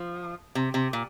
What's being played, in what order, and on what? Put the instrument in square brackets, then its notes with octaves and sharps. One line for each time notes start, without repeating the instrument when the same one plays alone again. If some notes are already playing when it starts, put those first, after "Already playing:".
Already playing: [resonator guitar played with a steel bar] F3
C3
C3
A#2